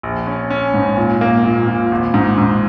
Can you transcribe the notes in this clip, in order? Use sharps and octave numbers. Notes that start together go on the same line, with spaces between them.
A#1
C#4
C#4
G#2
A#2
A#3
A#2
A#2
G#1
G#2
G#2